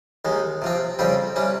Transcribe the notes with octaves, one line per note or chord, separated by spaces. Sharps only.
D#2 D#3 G#3
C3 F3 C4
F2 C#3 G3 C4 G4
C3 G3 C#4